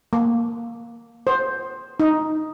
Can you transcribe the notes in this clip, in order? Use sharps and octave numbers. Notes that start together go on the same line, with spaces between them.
A#3
C5
D#4